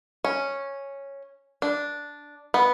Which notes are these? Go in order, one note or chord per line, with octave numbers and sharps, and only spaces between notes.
C#4
D4
B3